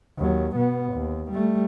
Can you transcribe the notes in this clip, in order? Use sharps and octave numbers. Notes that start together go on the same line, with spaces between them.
D#2 F#3
B2 B3
D#2
G3 A3